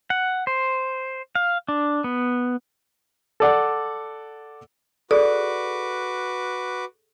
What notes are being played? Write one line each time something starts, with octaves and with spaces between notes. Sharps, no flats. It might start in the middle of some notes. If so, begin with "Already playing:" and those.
F#5
C5
F5
D4
B3
A4 D5 F#5
F#4 G#4 A4 B4 D5 D6